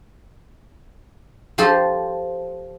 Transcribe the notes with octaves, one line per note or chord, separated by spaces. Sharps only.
F3 G4 A4 C5 C6